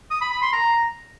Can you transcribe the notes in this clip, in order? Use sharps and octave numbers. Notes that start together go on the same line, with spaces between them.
D#6
B5
B5
C6
A#5